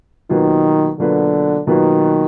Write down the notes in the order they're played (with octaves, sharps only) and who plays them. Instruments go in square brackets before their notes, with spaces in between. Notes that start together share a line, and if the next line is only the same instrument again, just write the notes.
[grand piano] B2 F#3 A#3 F4 B4 [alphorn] D#3
[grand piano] B2 F#3 A#3 F4 B4 [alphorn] D3
[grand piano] B2 F#3 A#3 F4 B4 [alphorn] D#3